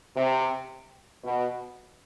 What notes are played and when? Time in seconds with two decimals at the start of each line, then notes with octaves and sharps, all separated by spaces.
0.16 C3
1.24 B2